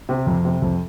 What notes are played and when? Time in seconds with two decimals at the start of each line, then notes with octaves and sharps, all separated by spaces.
0.09 C3
0.27 F2
0.45 C3
0.62 F2